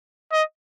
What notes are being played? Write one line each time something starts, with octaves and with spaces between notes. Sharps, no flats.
D#5